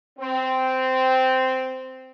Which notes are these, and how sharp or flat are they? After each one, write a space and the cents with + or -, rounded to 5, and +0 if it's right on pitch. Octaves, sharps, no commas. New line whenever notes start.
C4 -10